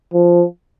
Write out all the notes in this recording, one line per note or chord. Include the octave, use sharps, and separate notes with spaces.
F3